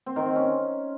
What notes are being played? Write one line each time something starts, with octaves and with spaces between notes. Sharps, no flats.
C4
D#3
C4
C#4